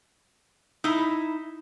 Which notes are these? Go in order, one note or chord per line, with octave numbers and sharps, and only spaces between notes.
D#4 E4